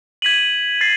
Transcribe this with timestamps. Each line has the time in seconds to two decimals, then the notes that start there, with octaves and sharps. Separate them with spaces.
0.22 G#6 B6 D#7 F#7
0.81 A6 C7